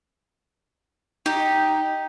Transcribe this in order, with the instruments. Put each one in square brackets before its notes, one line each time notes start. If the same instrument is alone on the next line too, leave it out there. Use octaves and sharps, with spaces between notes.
[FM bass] D#4 [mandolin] G4